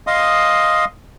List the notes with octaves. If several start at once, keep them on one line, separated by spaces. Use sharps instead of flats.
D#5 F5 C6 D#6